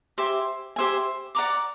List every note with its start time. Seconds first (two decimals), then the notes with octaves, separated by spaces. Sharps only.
0.18 G4 C5 E5 G#5
0.76 G4 C5 E5 G#5
1.35 D5 F#5 A#5 D6